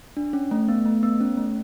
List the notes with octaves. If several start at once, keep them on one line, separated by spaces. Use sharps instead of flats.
D4
C#4
A3
B3
A3
B3
C#4
A3